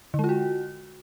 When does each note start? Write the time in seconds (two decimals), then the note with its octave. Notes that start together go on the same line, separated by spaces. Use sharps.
0.14 D3
0.19 G#3
0.24 F4
0.29 F#4